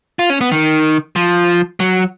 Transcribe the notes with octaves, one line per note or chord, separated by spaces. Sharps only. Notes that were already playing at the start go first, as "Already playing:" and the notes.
F4
C#4
B3
D#3
F3
F#3